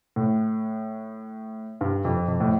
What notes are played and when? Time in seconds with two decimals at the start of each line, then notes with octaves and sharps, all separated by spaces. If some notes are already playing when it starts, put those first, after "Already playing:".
0.16 A2
1.81 G2
2.05 F2
2.28 F2
2.40 A2